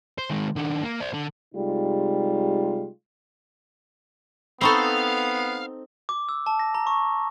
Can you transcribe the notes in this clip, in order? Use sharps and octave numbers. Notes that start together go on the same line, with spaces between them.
C5
D#3 G#3
D#3 D4
A#3
C5 D5
D3
C3 G3 G#3 D#4 F4
B3 C4 D#4 A4 F5 B5 C#6
D6
E6
A5
A#6
A#5
C#6